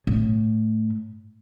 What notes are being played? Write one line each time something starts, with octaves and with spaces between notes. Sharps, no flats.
A2